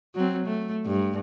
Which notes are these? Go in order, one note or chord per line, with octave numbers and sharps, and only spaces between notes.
F#3 C4
A3
G2